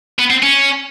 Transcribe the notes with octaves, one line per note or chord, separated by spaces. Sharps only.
B3
C4
C#4